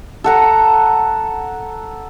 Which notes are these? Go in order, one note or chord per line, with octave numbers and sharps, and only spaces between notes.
A4 F#5 A#5